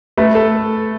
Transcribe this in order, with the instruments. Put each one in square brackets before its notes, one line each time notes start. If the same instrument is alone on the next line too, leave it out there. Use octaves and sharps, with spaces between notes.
[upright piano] A3 [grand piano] B4
[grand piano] A4